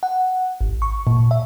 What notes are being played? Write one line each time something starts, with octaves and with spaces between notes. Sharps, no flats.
F#5
G#1
C#6
A#2
E5